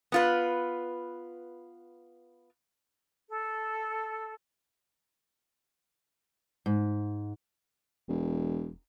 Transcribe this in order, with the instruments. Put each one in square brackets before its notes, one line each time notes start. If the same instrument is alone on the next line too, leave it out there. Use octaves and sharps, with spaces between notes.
[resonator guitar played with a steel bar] B3 F4 B4
[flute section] A4
[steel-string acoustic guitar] G#2
[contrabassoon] E1